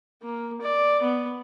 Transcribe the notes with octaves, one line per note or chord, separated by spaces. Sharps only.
A#3
D5
B3